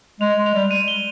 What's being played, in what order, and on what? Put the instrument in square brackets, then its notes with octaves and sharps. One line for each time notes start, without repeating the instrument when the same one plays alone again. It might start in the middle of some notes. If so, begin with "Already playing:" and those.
[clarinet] G#3 [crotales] F7
[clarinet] G#3
[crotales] F7
[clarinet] G3
[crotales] D#7
G7